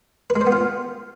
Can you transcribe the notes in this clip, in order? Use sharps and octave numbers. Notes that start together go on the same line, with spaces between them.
B4
G#3
C5
B3
F4